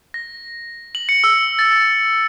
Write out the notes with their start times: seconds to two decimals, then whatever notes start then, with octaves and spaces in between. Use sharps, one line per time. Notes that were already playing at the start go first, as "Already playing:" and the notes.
0.14 A#6
0.95 F#7
1.09 C#7
1.24 E6
1.59 A6